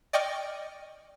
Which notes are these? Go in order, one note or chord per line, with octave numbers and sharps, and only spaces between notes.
D5 D#5 G5 C#6 D6 F6